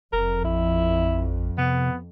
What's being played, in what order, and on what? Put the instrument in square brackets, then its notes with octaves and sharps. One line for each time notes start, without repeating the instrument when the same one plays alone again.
[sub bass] F1 [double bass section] F2 [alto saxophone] A#4
[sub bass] A1 [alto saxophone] E4
[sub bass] C3 [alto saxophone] B3